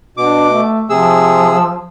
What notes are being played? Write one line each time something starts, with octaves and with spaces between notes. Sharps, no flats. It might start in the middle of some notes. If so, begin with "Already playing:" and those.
B2 D4 D6
A3
C3 F3 G#4 E6